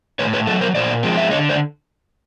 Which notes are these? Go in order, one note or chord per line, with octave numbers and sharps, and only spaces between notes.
A2 B4 C#5
B4 C#5
F#3 A3 A4 B4
A#4 C5
A#2 C5 D5
F3 G#3 C4
E5
D3 C#5 D#5
C5 D5